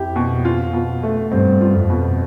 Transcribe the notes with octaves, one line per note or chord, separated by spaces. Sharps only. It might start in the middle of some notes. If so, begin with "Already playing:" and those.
Already playing: F2 E4 G4
B2
F4
B2
A3
G2 C4
F4
F2
B2